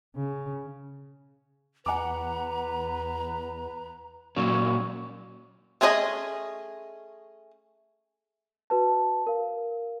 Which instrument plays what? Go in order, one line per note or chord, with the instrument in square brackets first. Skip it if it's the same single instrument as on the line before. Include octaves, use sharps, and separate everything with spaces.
[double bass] C#3
[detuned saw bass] E2 [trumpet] B4 [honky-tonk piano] F#5 D6 [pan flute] A#5
[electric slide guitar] A#2 F#3 C#4
[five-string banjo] A3 C#4 G#4 B4 D#5
[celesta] F#4 B4 A5
A#4 F5